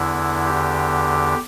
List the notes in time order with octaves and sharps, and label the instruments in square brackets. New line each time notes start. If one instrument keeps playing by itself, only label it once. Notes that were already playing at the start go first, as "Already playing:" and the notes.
Already playing: [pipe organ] E2 D3 E4
G4